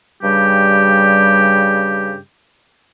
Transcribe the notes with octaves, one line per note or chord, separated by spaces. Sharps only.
G2 C#3 G3 G4